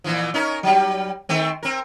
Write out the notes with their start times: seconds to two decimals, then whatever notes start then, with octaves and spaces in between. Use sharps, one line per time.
0.04 A#2 E3 F3
0.34 C#4 D#4 A#4
0.63 F#3 G3
1.29 D#3 A3 C4
1.63 C4 A#4